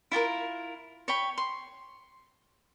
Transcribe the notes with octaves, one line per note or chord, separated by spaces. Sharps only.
E4 F4 G4 A#4
C#5 G5 B5
C6